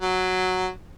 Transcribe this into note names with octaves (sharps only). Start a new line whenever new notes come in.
F#3